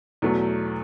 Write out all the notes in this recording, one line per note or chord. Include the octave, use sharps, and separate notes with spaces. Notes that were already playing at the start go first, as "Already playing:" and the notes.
E2 B2 F#3 A3